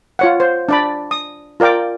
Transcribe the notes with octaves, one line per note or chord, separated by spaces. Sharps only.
F4 C#5 F#5
C5
D4 D5 B5
D#6
F4 A#4 D5 G5 D6